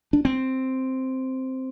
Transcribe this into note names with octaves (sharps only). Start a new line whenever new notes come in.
D4
C4